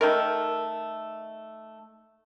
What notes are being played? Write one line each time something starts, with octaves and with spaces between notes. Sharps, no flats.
D#3 A3 A#4